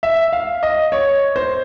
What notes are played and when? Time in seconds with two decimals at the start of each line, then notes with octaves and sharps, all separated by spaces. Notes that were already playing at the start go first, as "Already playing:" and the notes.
0.03 E5
0.33 F5
0.63 D#5
0.92 C#5
1.36 C5